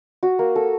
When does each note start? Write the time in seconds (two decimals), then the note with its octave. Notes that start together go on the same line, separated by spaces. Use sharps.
0.23 F#4
0.39 A#3
0.56 A4